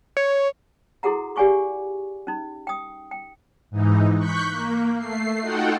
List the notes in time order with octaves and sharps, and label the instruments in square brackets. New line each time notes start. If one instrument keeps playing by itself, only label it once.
[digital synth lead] C#5
[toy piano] E4 F#4 G#4 A4 F#5 A#5
G4 D5 F#5 G#5 C#6 D6
C#4 D#4
G5 D#6
G5
[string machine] G#2 E3 D#4
C#6 F#6 G6 B6
A#3
A3 C7
D#4 F4 F#4 A4 F#5 G5